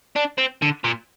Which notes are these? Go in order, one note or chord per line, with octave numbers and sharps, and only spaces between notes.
D4
C4
D3
A#2